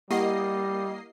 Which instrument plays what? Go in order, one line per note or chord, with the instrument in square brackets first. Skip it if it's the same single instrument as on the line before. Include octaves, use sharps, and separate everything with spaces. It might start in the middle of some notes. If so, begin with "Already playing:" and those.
[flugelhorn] G3 [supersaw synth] A#3 D#5 C7 [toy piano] E4 G4 F#5